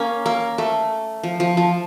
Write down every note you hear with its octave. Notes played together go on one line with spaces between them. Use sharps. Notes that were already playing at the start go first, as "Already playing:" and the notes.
Already playing: A#3 C#4
A#3
A3
F3
F3
F3